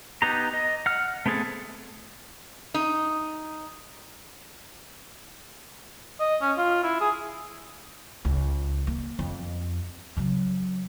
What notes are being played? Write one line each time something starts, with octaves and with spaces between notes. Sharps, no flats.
B3 D#4 G4 A#5
D#5
F#5 F6
A3 B3 C4 G#4 A4
D#4
D#5
C#4
F4
E4
G#4
C#2
A#3
F2
C#3 F#3